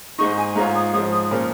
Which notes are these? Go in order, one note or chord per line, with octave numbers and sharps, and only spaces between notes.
G#2 G#3 D#4 C#6
G#5
G#2 G#3 F4 C#5 A#5
D#6
G#2 F3 G#3 D#6
D#6
A#2 F3 C#4 A#4